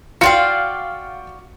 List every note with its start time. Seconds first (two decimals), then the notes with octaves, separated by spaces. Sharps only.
0.21 F4 F#4 D5 F5 G5 C#7